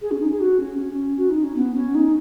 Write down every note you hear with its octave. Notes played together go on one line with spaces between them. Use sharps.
G#4
C#4
D#4
G#4
F#4
C#4
C#4
F#4
D#4
C#4
B3
C#4
D#4